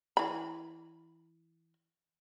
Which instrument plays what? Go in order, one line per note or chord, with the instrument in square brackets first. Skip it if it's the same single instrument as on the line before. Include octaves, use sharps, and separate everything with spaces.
[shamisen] E3 B5